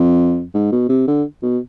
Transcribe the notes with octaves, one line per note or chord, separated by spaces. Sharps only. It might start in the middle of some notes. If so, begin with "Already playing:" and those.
Already playing: F2
G#2
B2
C3
D3
B2